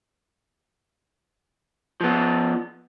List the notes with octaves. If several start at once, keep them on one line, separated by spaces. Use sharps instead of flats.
F3 B3